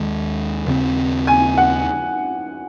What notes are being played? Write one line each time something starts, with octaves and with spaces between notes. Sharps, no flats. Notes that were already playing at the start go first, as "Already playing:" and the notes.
Already playing: D#2 D#3 G#3
D#2 C#3 G#3 C4
G#5
F#5